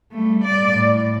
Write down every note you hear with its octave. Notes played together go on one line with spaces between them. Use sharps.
G3 A3
D5
A2